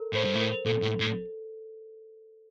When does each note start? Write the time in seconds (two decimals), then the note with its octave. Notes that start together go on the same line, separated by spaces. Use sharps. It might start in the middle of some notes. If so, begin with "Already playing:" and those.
Already playing: A4 A#4
0.14 A2 C5
0.25 G2
0.35 A2
0.40 A#4
0.66 A#2 A4
0.82 A2
1.00 A2